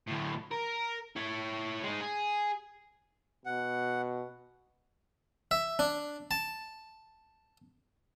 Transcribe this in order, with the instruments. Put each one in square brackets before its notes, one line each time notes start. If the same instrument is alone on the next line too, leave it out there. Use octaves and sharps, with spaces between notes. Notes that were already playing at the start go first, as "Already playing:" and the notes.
[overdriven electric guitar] D2 A2
A#4
E4 C#5
G#3 D#4
G#4
[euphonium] B2 [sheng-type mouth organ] F#5
[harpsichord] E5
D4
A5